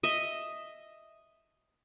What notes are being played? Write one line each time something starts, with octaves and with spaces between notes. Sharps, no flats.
D#5 E5